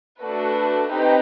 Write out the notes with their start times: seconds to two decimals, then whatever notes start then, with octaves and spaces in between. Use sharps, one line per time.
0.21 A3 D4 F#4 A4 B4
0.87 C4 D#4 G4 B4